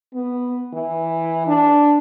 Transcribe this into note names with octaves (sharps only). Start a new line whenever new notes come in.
B3
E3
D4